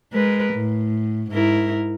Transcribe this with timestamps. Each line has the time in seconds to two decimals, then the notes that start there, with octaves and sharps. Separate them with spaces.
0.13 G#3 A#4 B4
0.54 A2
1.31 G#2 E4 A#4